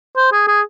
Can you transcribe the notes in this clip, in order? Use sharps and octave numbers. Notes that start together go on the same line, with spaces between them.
C5
G#4
G#4